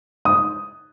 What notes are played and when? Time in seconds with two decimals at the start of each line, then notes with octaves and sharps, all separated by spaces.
0.25 D#6